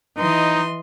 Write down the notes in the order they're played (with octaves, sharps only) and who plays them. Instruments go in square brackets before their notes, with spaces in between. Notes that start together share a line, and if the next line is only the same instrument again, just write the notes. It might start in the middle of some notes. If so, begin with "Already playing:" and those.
[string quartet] E3 D#5 C6 [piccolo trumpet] D#4